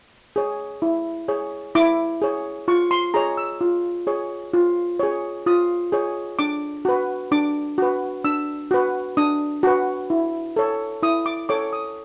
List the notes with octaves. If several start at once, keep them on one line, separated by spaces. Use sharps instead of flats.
G#4 C#5
E4
G#4 C#5
E4 D6
G#4 C#5
F4 C#6
C6
G#4 C#5 A#5
E6
F4
G#4 C#5
F4
G#4 C#5
F4 D#6
G#4 C#5
D4 D6
F#4 B4
D4 D6
F#4 B4
D4 E6
F#4 B4
D4 D#6
F#4 B4
E4
A4 C#5
E4 D#6
D6
A4 C#5 D6
D#6